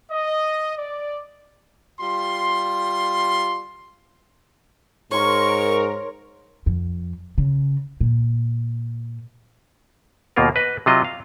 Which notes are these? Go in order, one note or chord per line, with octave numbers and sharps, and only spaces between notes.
D#5
D5
G3 F4 C6
G#2 A#4 C#5 C6 C#6
F2
C#3
A#2
D#2 B2 A#3 F4 A#4
B4 D#5
C3 F#3 F4 D#5
F5